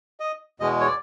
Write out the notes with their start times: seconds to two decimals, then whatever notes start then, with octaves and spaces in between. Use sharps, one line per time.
0.20 D#5
0.60 E2 B2 G#3 D#5
0.81 C#5
0.87 D5